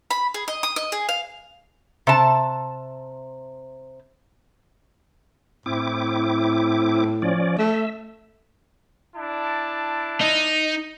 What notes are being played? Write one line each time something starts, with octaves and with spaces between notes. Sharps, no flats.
B5
G#4
D#5
D#6
D#5
G#4
F5
C3 A5
A2 C4 E4 D6
F3 C#4 D5
A3 E5
D4 E4 A5
D#4